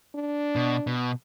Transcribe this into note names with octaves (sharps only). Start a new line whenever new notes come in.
D4
B2
B2